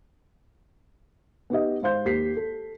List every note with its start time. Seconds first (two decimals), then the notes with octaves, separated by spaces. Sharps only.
1.50 B3 D#4 G4 D#5
1.82 G#2 C5 F5 C6 G6
2.05 D#2 G4 B6 C7
2.37 A4